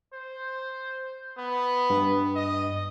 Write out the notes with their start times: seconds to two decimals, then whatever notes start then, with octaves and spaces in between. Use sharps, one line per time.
0.13 C5
1.38 B3
1.90 G2
2.35 D#5